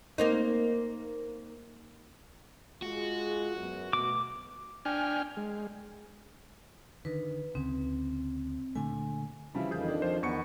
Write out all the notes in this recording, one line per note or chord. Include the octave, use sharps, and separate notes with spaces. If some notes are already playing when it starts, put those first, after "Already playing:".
A#3 C4 D#4
G#3 F4 F#4 G#4
F#2 B3
B2 A3 D6
D4 G5 G#5 F6
G#3
D3 D#3 B4
D2 C#3 C4
A#2 D3 A3 G#5
C#3 E3 F3 G3 E4
F2 D#3 E3 G#4 G6
D4
F3 F4 C5
E2 D#3 B3 C#6 C#7